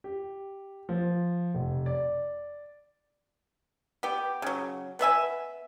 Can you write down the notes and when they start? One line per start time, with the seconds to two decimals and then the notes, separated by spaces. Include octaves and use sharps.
0.04 G4
0.89 F3
1.54 F1
1.86 D5
4.03 B3 G4
4.42 C#3 F#3
4.99 B3 B4 E5 G#5